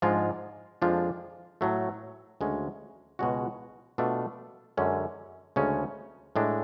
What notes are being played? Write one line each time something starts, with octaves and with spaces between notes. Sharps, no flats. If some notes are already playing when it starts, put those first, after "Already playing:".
G#2 F3 G#3 D4 F4
F2 F3 G#3 D4 F4
A2 F#3 A3
D2 C#3 G#3 C#4 F#4
C#2 B2 G#3 C#4 F#4
B2 A3 D4 F4
F#2 D3 G#3 C#4
D2 C#3 G#3 C#4
A2 G#3 D4